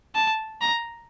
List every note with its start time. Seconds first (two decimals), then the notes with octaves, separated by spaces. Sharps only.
0.15 A5
0.61 A#5